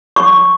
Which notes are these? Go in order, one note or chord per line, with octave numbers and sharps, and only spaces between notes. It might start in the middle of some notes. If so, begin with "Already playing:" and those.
C#6